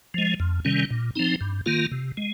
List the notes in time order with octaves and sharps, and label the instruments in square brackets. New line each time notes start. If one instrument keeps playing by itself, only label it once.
[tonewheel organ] F3 G#3
F2
C3 D#3 G3 C#4
A#2
F3 C4 D#4
G2
D#3 A#3 F4
C3
G#3